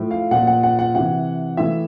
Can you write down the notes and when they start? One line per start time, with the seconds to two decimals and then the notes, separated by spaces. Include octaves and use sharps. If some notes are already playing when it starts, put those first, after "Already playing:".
Already playing: A2 F3
0.11 F5
0.31 A#2 F3 F#5
0.47 F#5
0.63 F#5
0.79 F#5
0.95 C3 E3 F#5
1.57 A2 E3 E5